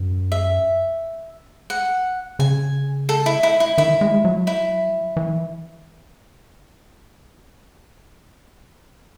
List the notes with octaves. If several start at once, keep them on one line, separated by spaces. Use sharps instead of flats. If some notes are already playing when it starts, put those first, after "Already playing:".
Already playing: F#2
E5
F#5
C#3 G#5
A4
E4
E4
E4
D#3 E4
G#3
F#3
E4
E3